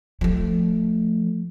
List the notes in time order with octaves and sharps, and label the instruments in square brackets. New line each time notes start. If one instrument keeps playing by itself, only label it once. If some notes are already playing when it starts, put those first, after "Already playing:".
[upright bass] F3 A3